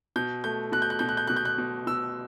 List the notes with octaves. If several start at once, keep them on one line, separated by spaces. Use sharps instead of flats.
B2 G6
A3 G6
B2 F#6
G6
F#6
B2 G6
F#6
G6
B2 F#6
G6
F#6
B2
B2 E6